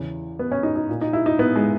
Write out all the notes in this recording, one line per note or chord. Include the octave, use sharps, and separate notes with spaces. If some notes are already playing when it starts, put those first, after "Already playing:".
Already playing: E2 C#3 E3
B3
C#4
D#4
D#4
A#2
D#4
E4
D#4
B3
G#3